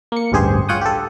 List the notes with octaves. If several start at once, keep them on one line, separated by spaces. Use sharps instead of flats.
A#3 C#7
A1 D2 G2 G4 G#4 C5
F4 C#5 F#5 G5 D#6
G4 A4